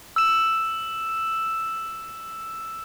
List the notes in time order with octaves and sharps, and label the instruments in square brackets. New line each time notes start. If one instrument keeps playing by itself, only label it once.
[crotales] E6 E7